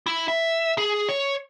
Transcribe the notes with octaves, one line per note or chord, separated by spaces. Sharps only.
E4
E5
G#4
C#5